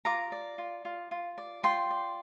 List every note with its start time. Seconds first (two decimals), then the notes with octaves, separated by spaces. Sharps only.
0.05 F4 A#5 D6
0.32 D5
0.58 F4
0.85 F4
1.11 F4
1.38 D5
1.63 F4 G5 C6
1.90 D5